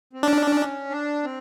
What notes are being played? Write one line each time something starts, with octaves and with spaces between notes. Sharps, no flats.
C4
C#4 D4
D4
C4